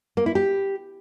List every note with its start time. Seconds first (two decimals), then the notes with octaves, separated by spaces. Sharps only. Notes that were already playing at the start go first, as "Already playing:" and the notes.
0.17 A#3
0.26 E4
0.35 G4